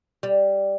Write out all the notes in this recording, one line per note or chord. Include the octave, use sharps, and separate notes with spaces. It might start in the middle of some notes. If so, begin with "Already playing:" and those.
G3